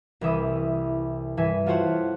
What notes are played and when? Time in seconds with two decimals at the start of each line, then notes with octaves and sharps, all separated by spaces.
0.21 C2 E3 E5 D#6
1.37 G2 E3 E5 G#5 B6
1.66 F4 F#4 A4 C5 C#5 F#5